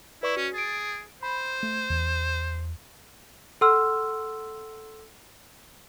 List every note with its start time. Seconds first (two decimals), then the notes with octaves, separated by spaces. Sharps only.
0.23 E4 B4 D5 C#6
0.37 C#4 F#4
0.54 G#4 A6 D7
1.23 C5 B5
1.63 A3
1.90 E2
3.61 A4 F#5 C6 E6 F6